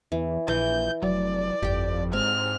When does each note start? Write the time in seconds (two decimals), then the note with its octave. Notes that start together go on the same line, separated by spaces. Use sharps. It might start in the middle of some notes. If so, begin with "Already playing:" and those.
0.12 E2 E3
0.48 A#1 E3 G6
1.03 F1 F#3 D5
1.63 G1 F2 G4 G5
2.13 G#2 C4 F6